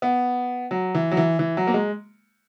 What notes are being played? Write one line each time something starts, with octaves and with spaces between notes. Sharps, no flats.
B3
F#3
E3
F#3
E3
E3
F#3
A#3
G#3